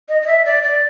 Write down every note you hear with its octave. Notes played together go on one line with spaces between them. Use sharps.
D#5
D#5
E5
D5
D5